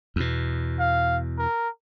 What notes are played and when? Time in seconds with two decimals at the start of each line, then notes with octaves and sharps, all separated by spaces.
0.16 E2 B2
0.79 F5
1.38 A#4